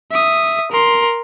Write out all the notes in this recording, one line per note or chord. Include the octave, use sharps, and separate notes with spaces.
E5 D#6
A#4 C6